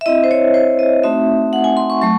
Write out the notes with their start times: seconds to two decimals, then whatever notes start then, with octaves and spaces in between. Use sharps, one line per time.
0.01 E5
0.06 C4 E4 D#5
0.24 C5
0.31 C#5
0.54 C5
0.79 D#5
1.04 A3 C4 D#4 F#4 E5
1.53 F#5
1.64 G#5
1.77 C6
1.90 C#6
2.01 F#3 A3 C#6